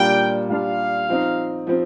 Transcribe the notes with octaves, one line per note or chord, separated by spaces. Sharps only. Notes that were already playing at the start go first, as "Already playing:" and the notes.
Already playing: A#2 G3 D4 F4 G5
A#2 G3 D4 F4 F5
F3 C4 D#4
F3 C4